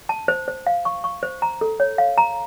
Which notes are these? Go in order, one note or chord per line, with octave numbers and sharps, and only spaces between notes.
A5
C5
C5
F5
C#6
C#6
C5
A#5
A4
C#5
F5
A#5